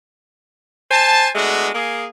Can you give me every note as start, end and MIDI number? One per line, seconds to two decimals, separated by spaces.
0.91 1.29 72
0.91 1.29 80
0.91 1.29 81
1.35 1.69 56
1.35 1.69 57
1.35 1.69 59
1.35 1.69 62
1.35 1.69 66
1.74 2.06 58
1.74 2.06 68